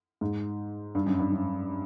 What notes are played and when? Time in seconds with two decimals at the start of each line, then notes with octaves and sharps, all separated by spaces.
0.21 G#2
0.95 G2
1.06 F#2
1.19 G2
1.32 F#2